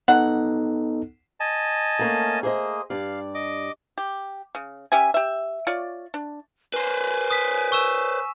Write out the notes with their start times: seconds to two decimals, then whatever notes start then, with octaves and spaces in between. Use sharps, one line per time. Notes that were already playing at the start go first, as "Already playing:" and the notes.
0.08 B3 D#4 A4 F#5
1.40 D#5 G#5 A5
1.99 A3 A#3 C#4
2.43 A#3 G#4 C5 D#5
2.90 G2 D5 F5
3.35 D#5 D6
3.98 G4
4.55 C#3
4.92 C#4 G4 E5 G#5
5.14 G4 E5
5.67 F4 C#5 D5
6.14 D4
6.74 B4 C5 G#5
7.31 D#6 B6
7.72 C#6 E6 E7